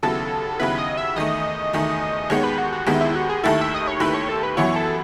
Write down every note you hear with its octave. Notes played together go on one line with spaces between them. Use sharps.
D#2 C#3 F#3 B3 E4 A4
D#2 C#3 F#3 B3 E4 B4
D#5
E5
E2 D#3 A3 D#5
E2 D#3 A3
D#2 D#3 G#3 B3 C#5
B4
F#4
F#4
D#2 D#3 G#3 B3 E4
E4
F#4
G#4
D#2 D#3 A3 E4 A4
E5
D#5
C#5
D#2 D#3 A3 E4 B4
C#5
A4
B4
F#2 E3 B3 E4 C#5
A4